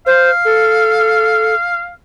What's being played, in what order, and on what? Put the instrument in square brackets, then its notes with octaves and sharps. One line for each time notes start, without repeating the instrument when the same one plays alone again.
[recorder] C5 [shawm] F5
[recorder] A4